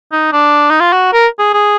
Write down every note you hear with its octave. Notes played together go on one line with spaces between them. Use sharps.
D#4
D4
D#4
F4
F#4
A#4
G#4
G#4